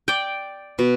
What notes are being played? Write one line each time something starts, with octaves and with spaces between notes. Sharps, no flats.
D5 G5
B2